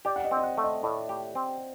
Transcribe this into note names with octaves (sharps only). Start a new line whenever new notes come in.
G4 D5
F#5
D#5
C4
D#5
F#5
A3
D#5
A2 D5
G4
C4